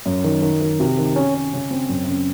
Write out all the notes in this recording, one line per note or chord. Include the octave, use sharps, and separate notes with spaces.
F#2
D#3
D#3
D#3
C3
D#3
C#4
C#4
C#3
C4
F#2
C#3